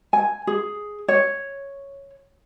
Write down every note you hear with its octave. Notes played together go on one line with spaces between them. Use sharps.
G#5
G#4
C#5